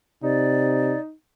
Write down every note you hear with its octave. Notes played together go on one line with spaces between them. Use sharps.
C3 D#4 D5